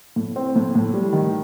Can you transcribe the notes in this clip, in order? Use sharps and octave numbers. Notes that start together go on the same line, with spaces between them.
A2
C4
A2
A2
G3
D#3